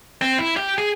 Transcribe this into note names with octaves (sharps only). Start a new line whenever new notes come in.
C4
E4
G4
G#4